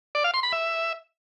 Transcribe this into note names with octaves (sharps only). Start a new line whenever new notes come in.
D5
F5
C6
B5
E5